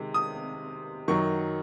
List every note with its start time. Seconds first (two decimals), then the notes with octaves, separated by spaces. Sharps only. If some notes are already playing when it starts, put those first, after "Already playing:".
Already playing: C3 D#3 G#3
0.14 D#6
1.08 F#2 D#3 F#3 C#6